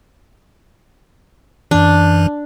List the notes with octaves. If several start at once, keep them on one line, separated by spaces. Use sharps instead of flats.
F#2 E3 D4